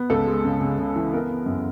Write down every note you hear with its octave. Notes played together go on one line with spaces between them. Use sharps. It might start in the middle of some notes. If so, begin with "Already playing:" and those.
Already playing: B3
C#2 A4
G#3
C#3
C#3
C#3
E3
B3 A#4
B3
F#2